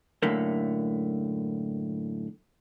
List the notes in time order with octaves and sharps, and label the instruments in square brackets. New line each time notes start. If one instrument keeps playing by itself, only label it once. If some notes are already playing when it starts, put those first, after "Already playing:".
[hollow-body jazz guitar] F#2 A2 D3 A3 A#3